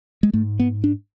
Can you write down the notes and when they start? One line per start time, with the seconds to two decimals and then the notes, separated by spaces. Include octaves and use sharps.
0.23 G#3
0.33 G#2 A3
0.60 B3
0.84 D4